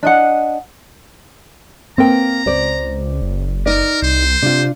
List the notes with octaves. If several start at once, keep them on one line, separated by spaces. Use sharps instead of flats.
D4 D#5 F#5
A#3 C4 A#4 G5 A#5
C#2 C5 D5
F#1
D#4 A#4 D5
C2 C5
C3 D4 F4